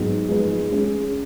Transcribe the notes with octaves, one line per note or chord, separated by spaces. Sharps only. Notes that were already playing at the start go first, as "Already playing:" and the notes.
Already playing: G#2 F#3 B3 D#4 G#4
F3 G#3 D#4 G#4 B4
G#3 C#4 G#4